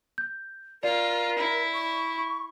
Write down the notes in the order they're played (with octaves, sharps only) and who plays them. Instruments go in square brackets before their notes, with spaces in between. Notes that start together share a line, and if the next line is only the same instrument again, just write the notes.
[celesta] G6
[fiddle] F4 [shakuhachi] A#4 [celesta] D5
[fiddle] E4
[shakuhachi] C#6